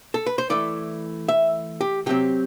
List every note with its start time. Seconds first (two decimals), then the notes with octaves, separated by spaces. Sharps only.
0.14 A4
0.26 B4
0.38 C5
0.50 E3 A3 E4 D5
1.28 E5
1.81 G4
2.06 C3 F#3 C4 G4